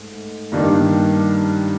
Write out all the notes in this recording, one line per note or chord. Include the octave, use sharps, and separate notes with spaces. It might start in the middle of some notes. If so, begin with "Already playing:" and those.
Already playing: G#2 A3
G2 D#3 G3 A#3 D4